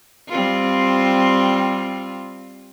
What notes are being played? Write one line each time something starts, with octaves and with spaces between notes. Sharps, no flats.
G3 C4 F4